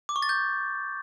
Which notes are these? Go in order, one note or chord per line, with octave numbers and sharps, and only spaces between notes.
D6
C#6
A6
G6